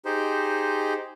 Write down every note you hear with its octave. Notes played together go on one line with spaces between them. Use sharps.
D#4 G4 G#4 C5